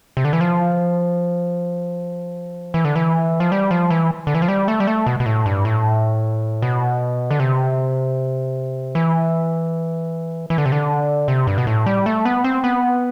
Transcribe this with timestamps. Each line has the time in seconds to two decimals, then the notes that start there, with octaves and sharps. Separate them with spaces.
0.17 C3
0.25 D3
0.33 E3
0.41 F3
2.74 E3
2.85 D3
2.96 E3
3.40 F3
3.52 G3
3.71 F3
3.90 E3
4.27 D3
4.35 E3
4.42 F3
4.48 G3
4.68 A3
4.80 G3
4.87 A3
5.07 B2
5.20 B2
5.26 A2
5.46 G2
5.65 A2
6.62 B2
7.31 D3
7.40 C3
8.95 E3
10.50 E3
10.58 D3
10.66 C3
10.72 D3
11.28 C3
11.47 G2
11.58 B2
11.67 A2
11.86 G3
12.06 A3
12.25 B3
12.44 C4
12.64 B3